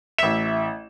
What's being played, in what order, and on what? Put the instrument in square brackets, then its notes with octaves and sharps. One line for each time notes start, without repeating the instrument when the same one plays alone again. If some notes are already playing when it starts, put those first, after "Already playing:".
[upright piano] A1 E7 [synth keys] E5